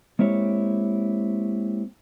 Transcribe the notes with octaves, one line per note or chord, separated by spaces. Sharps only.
G#3 A#3 C4 E4 G4 C#5